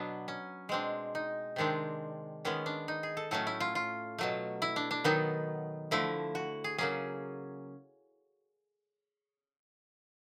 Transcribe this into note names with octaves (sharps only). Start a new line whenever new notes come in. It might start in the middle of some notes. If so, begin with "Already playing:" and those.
Already playing: B2 F#3 B3 D4
C#4
B2 G#3 C4 D4
D#4
C3 D#3 G#3 C4 D4
D#3 G#3 B3 C#4
D4
D#4
G#4
A4
A2 F#3 A3 C#4 A4
E4
F4
F4
B2 F#3 A3
E4
D4
D4
D#3 F#3 B3 D#4
D3 F3 A3 E4
F#4
G#4
C#3 F#3 A#3 C#4 G#4